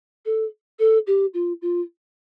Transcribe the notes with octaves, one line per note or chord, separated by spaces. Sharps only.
A4
A4
G4
F4
F4